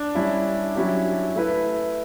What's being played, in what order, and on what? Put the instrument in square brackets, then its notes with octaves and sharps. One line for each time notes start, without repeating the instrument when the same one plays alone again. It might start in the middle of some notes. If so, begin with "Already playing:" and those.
Already playing: [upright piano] D4
[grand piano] G3 C#4 E4
F#3 C#4 E4 G4
A3 E4 B4